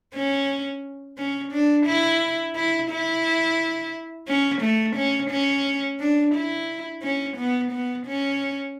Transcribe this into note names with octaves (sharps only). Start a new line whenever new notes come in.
C#4
C#4
D4
E4
E4
E4
C#4
A3
C#4
C#4
D4
E4
C#4
B3
B3
C#4